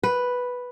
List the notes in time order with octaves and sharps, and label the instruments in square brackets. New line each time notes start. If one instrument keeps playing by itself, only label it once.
[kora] B4